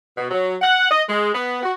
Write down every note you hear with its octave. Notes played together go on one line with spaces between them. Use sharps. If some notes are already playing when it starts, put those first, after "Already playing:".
B2
F#3
F#5
D#5
G#3
B3
F#4